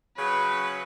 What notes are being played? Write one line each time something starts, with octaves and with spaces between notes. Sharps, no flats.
C#3 F#3 B4